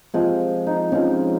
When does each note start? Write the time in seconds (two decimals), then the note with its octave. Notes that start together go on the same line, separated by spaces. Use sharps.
0.14 C3 F3 G#3 G#4
0.67 D#4
0.92 C3 F3 G#3 C#4